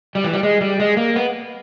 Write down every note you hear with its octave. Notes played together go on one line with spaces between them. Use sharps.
G3
E3
G3
G#3
G3
G#3
A#3
B3